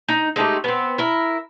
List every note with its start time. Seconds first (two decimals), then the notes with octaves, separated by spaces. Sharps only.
0.08 D#4
0.36 G#3 A3 D#4 G4
0.64 B3 C4
0.98 E4 A#4